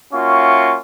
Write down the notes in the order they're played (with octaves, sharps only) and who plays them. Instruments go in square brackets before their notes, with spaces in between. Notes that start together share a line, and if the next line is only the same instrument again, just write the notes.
[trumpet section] A#3 C#4 F4 F#4 E5 C#6